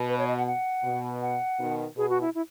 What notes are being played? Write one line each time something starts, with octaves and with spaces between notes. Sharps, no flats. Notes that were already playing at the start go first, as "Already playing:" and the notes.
Already playing: B2
B4
C#5
D#5
F#5
F#5
B2
F#5
B2 D#3
B2 G#4
F#4
E4
E4